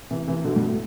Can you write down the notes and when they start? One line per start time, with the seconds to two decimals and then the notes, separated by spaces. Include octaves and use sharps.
0.11 C3 E3
0.27 C3 E3
0.44 B2 D3
0.56 G2 B2
0.67 A2